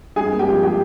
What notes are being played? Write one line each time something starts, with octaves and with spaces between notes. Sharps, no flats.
G2 G#4 G#5
A#3
G4 G5
F3
G4 G5